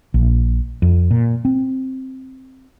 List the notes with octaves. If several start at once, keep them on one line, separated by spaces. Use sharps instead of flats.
A#1
F2
A#2
C4